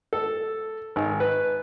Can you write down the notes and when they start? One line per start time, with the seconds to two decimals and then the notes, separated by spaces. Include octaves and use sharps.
0.13 A4
0.96 G#1
1.20 B4